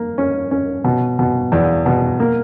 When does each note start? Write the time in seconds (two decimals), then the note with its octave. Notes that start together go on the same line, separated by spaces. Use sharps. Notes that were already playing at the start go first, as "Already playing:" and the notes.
Already playing: A#3
0.18 C#4
0.51 C#4
0.84 B2
1.19 B2
1.52 E2
1.86 B2
2.20 A#3